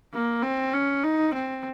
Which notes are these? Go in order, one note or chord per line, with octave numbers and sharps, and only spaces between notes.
A#3
C4
C#4
D#4
C4